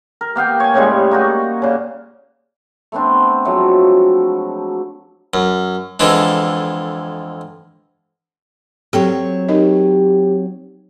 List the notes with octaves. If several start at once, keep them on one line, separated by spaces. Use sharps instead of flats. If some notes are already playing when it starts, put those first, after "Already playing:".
A#4
A#3 B3 F5 G5
C#5 G#5
A2 C#3 G3 G#3
A#3 D#4 F#4
A#2 C#3
A3 B3 C4 D4
F3 F#3 G#3 A3
F#2
F2 D3 E3 G#3 D4
F#3 C4 G4 A4 C#5 G5
D#4 G4 A#4 D#5